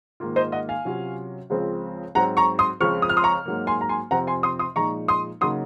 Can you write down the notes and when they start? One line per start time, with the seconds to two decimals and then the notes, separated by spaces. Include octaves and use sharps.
0.20 G#2 D#3 A#3 F4
0.36 C5 D#5
0.52 D#5 F#5
0.69 F5 G#5
0.85 C3 F#3 C#4 F4
1.50 C#2 C#3 F3 G#3 C4
2.15 G#2 F#3 C4 F#5 A#5
2.37 A#5 C#6
2.59 C6 D#6
2.80 C#2 C#3 F3 C4 C#6 F6
3.02 D#6
3.09 F6
3.17 C6 D#6
3.24 A#5 C#6
3.46 G#2 F#3 A#3
3.67 G#5 C6
3.81 A#5
3.89 G#5 C6
4.11 F2 C3 F3 C4 F#5 A#5
4.27 G#5 C6
4.43 C6 D#6
4.59 C6 D#6
4.76 A#2 F3 G#3 D#4 A#5 C#6
5.08 C6 D#6
5.41 C#3 F#3 A#3 D#4 C6 D#6